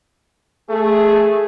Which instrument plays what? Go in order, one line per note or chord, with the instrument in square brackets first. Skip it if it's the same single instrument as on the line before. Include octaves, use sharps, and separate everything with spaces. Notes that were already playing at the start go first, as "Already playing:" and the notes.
[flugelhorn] A3 [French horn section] G#4